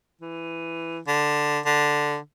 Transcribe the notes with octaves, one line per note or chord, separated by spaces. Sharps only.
E3
D3
D3